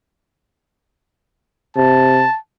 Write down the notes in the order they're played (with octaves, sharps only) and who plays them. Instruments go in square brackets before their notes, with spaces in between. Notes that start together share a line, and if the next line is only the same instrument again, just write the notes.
[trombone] C3 [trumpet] A5